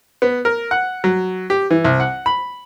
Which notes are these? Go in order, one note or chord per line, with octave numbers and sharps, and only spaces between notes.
B3
A#4
F#5
F#3
G4
E3
C2
F#5
B5